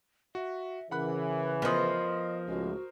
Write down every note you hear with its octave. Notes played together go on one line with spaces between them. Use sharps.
F#4 E5
C#3 E3 A#4 F#5 B5 F#6
F3 B3 A#4 C5 D#5 D#6
C#2 A2 G#3 F#4